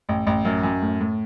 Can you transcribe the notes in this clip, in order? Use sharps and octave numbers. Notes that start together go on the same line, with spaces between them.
A1
A1
F#2
F#2
A2
A2